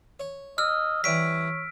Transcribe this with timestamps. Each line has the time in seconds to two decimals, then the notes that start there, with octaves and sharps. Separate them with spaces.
0.20 C#5
0.58 D#5 E6 F6
1.04 E3 G3 C#5 B6 D7